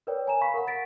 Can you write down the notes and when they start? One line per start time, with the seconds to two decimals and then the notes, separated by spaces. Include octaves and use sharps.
0.07 A#4 B4 C#5 D5 G5
0.27 G#5 A#5 E7
0.41 F5 B5 C#6 B6
0.54 A#4 F#5
0.67 A6 B6 D7